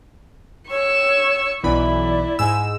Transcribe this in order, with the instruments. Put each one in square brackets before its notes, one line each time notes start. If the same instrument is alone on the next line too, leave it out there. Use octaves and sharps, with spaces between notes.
[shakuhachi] C#5 [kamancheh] C#6 E6
[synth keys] B1 E3 B5 [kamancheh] E4 [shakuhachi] D5
[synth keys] G#2 E6 [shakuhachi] G#5